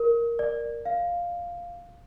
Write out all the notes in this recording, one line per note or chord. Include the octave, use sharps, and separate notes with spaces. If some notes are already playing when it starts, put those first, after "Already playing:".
Already playing: A#4
D5
F5